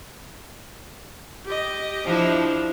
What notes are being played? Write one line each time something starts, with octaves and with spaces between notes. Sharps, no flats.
G4 D#5
F3 D4 E4